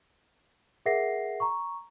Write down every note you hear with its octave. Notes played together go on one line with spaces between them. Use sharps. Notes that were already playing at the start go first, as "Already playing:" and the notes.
G#4 A#4 E5 F#5 A#6 C7
A#5 C#6